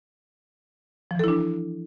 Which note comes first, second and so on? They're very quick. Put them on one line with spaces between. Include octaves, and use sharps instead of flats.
F3 E3 A4 E4 D4